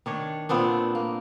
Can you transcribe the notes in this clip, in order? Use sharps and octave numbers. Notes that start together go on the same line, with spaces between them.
D#3 D4 C#5
A#2 B3 C4 D4
A#3